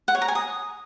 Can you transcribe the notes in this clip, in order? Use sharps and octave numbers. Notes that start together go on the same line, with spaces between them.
F#5
C#5
A#5
G#5
D#6